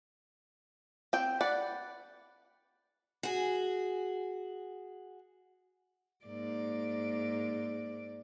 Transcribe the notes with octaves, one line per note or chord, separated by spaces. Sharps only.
C4 G5
B4 D5 F#5
F#4 G#4
G#2 A#3 D5